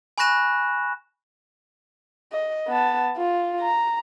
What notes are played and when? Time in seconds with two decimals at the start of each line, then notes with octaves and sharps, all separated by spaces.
0.18 G#5 B5 C#6 F#6 A#6 E7
2.32 D#5
2.68 B3 A5
3.17 F4
3.61 A#5